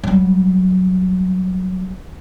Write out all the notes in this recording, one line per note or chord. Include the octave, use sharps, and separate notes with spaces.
F#3 G3